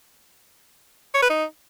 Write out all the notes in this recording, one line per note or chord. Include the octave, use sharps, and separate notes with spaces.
C#5
B4
D#4